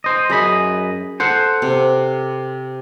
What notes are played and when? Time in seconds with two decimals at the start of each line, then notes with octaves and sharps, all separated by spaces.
0.04 C5 D#5
0.30 F#2 G#4 D#5 B5
1.20 A4 C5 F#5
1.62 C3